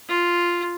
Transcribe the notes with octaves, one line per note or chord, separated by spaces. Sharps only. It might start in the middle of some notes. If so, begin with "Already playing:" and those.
F4